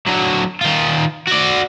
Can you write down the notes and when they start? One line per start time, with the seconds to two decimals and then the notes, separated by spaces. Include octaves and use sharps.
0.07 D3 F#3
0.61 D#3 F4
1.28 F#4 D5